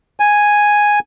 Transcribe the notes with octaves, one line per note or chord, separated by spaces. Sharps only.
G#5